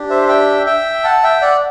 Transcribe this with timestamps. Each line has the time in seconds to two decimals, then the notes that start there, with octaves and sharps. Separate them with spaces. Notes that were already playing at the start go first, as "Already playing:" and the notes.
Already playing: D4 G4
0.10 C5 E5
0.29 E5 G5
0.66 E5 G5
1.04 F#5 A5
1.23 E5 G5
1.42 D5 F#5